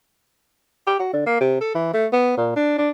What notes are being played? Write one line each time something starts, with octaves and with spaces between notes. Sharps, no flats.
G4
F#4
D3
A#3
C3
A4
E3
A3
B3
A#2
D4
D4